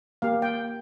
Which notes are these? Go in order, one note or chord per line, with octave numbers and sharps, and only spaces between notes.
A#3 G4 F5
G5